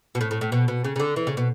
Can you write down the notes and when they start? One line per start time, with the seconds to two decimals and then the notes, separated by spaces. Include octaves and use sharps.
0.15 B2
0.21 A2
0.31 A2
0.41 A2
0.52 B2
0.68 B2
0.84 C#3
0.96 C#3
1.00 D3
1.16 E3
1.27 C#3
1.37 B2